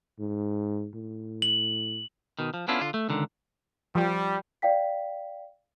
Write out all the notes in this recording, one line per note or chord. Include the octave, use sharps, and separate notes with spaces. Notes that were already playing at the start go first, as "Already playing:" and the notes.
G#2
A2
F#7
B2 D#3
F3
B3 C#4 D4 E4 F4 A4
D3 F4
A3
C#2 D3 D#3
F3 G3
D5 F5 G5 B6